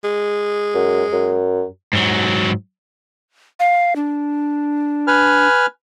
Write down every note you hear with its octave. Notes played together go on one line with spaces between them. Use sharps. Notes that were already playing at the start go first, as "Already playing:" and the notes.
G#3
F#2
F#2
G#2 F#3
F5
D4
B4 G#5 F6